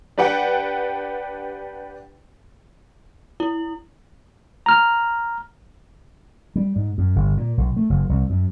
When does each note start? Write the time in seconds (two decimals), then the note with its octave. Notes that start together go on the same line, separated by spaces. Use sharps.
0.18 D4 G4 B4 F#5 G5
3.40 E4
4.66 A#5 F6
6.56 G3
6.76 G#2
6.98 F#2
7.16 G1
7.37 A#2
7.57 B1
7.76 A3
7.90 F#1
8.09 C2
8.30 F#2